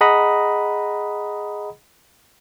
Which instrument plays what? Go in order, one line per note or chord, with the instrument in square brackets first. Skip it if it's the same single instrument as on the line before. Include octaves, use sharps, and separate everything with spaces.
[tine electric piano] G#4 D#5 F#5 A#5 B5 D#6